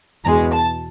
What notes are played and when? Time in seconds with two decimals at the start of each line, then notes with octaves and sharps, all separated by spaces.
0.24 E2 B2 G#3 A#5
0.53 A5